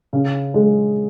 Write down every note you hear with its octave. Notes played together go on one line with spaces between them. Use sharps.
C#3
G#3